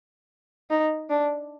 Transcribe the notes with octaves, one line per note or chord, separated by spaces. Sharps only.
D#4
D4